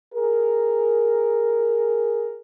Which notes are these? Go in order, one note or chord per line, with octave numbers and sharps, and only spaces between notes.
G#4 A#4